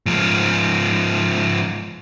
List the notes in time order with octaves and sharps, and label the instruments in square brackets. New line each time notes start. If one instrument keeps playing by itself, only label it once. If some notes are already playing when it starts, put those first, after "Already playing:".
[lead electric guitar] G#2 F3